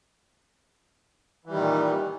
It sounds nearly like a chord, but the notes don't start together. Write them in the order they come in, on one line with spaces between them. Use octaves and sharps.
E3 G3 D#3 A#2